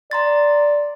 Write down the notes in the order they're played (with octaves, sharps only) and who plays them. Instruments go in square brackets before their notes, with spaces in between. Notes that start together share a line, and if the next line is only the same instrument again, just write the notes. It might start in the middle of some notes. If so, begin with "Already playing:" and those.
[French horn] D5 [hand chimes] A#5 C6 A6